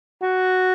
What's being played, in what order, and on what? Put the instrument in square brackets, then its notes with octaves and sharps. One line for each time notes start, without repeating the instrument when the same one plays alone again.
[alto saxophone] F#4